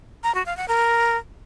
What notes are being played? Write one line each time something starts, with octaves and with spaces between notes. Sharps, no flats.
A#5
F#4
F5
F#5
A#4